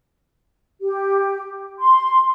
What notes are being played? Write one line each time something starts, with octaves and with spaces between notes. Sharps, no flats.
G4
C6